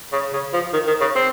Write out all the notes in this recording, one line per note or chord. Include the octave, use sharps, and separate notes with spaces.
C#3
C#3
F3
D#3
D#3
C#3
C4